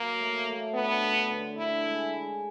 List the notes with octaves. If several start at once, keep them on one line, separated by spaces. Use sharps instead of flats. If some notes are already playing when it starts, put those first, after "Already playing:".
Already playing: F#3 A#3
A3
A3
B3 D4
D3
D3
D3 E4
G#3
G#3